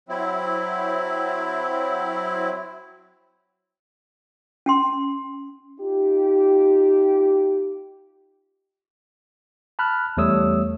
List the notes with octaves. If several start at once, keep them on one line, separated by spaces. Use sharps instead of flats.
F#3 C4 E4
C#4 G5 C6
D#4 F4 G4
A5 B5 F6 F#6
E2 G3 A3 C#5 D#6 E6